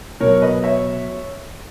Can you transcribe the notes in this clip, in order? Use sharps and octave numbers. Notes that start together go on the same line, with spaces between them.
B2 F#3 A#4 C#5
B4 D#5
C#5 E5